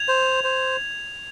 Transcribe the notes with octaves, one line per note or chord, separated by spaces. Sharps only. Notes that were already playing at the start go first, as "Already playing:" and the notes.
Already playing: G#6 F7
C5
C5